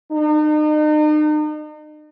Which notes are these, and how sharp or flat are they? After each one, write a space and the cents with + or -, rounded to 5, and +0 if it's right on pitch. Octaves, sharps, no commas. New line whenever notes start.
D#4 -40